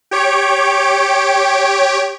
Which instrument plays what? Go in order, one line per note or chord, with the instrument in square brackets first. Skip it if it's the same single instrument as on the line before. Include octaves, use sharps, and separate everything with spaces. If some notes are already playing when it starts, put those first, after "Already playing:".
[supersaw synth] G4 C#5 D7